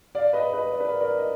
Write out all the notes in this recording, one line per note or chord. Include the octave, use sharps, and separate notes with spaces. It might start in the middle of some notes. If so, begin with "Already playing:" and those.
D5 F5
B4 D#5
B4 D#5
D5
B4
A#4 D5
A#4 D5
D#5